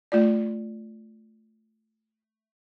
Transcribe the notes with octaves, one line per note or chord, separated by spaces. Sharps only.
A3 F4 D5